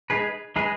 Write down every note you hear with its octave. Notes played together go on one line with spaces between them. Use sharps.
G#3 D#4 G#4 B4
G#3 D#4 G#4 B4